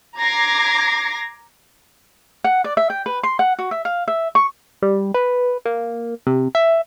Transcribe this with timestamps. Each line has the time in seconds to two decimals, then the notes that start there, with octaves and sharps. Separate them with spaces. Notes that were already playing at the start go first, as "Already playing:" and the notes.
0.18 A#5 D6 G#6 A#6 C7
2.44 F#5
2.64 D5
2.77 E5
2.90 G5
3.06 B4
3.23 C6
3.39 F#5
3.59 F#4
3.71 E5
3.85 F5
4.08 E5
4.35 C#6
4.82 G3
5.14 B4
5.65 A#3
6.27 C3
6.55 E5